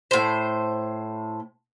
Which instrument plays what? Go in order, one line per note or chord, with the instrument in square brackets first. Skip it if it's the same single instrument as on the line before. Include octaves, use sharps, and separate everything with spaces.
[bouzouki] A2 C5